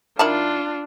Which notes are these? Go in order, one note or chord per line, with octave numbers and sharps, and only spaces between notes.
D#3 D4 E4 F4 A5